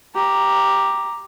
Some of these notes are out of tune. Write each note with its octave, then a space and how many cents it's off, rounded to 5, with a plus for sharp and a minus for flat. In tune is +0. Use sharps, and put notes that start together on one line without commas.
G4 +0 A#5 +0